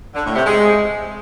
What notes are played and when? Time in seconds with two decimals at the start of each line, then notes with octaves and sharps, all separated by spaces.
0.15 D3
0.25 A2
0.35 C3
0.45 G#3